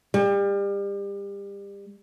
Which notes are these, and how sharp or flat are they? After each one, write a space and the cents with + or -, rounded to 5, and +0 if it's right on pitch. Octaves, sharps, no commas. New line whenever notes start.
G3 +30